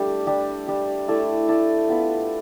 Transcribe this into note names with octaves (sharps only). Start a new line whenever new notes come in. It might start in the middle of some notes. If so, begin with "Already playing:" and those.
Already playing: G3 A3 D4 G4
G3 D4 G4
G3 D4 G4
A3 E4 A4 D5
A3 E4 A4 D5
B3 F4 B4